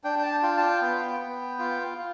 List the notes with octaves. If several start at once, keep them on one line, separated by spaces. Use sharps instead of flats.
D4 G5
G5
A5
F4 G5
A5
G5
B3
B3
F4
F4